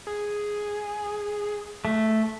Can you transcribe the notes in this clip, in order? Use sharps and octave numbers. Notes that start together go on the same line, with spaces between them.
G#4
A3